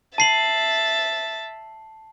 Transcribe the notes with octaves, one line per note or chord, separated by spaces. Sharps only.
E5 A5 A6 C7 F#7